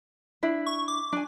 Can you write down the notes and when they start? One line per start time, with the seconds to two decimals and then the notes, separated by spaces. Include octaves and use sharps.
0.43 D4 E4 E5
0.66 C#6
0.88 D6
1.13 D4 G#5